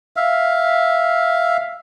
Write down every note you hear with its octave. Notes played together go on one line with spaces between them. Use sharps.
E5 F5